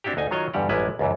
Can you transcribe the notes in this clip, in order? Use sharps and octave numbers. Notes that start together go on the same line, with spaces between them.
C4 D4 E4 F#4 G4
D2 D#4 G#5
D#3 F#3 F4 C#5 D#5
E2 G2 D3 G3 G4 F#5
A1 F#2 G3 G#3 E4 B4
C#2 F#2 E3